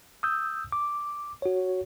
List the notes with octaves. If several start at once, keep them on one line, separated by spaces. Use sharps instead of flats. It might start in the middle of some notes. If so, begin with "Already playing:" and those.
D#6 E6 G6
D6
F#4 C#5